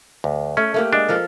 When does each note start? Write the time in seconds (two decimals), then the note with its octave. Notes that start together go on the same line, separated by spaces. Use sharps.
0.24 D2
0.57 A3 C#4
0.74 A3 A#3 G4
0.93 G#3 D4
1.09 F3 A4 A#4